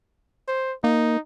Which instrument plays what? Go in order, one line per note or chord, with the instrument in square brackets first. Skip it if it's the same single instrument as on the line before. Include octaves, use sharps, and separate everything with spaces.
[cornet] C5
[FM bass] A#3 [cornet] D#4